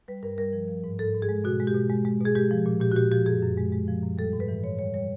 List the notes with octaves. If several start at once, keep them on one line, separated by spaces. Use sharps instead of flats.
G3 B4
G2 A#4
G3 A#4
F3
F3
G#2
G#2 A4
G#2
G#4
G#3
B2 F#4
G#3
G4
B2
G#3
G#3
B2 G#4
G#3 G4
F3
A#2
A#2 G4
F#4
A#2 G4
F3 G4
F#2 G#4
F#2
G#3
G#3
F3
F#2
G3 A4
G#2
B4
E3
G#2 C#5
G3 C#5
G3 C#5